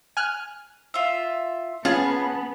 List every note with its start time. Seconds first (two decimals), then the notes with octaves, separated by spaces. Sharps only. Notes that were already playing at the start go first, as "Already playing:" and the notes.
0.17 G#5 F6 F#6
0.94 F4 E5
1.85 B3 C#4 F4 G#4 A5